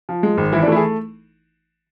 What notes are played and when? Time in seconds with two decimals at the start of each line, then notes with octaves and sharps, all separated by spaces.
0.09 F3
0.23 G#3
0.38 G#1
0.52 E3 E4
0.62 D4
0.68 A3 E4
0.76 G#4